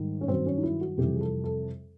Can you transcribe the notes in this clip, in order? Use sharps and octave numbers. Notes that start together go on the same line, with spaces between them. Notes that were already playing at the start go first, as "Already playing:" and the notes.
Already playing: G#2 D#3 G3
C#4
G2 D#3 F#3 C4
C#4
D#4
E4
F#4
F2 C3 E3 G3 G4
G#4
A4
A4